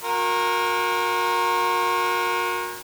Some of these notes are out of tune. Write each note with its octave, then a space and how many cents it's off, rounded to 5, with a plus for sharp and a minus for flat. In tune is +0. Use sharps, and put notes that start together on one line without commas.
F#4 -40 A#4 +0 G#5 -45